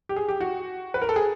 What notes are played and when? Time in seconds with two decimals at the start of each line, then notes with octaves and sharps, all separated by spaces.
0.09 G4
0.16 G#4
0.28 G4
0.40 F#4
0.94 B4
1.02 A#4
1.09 A4
1.16 G#4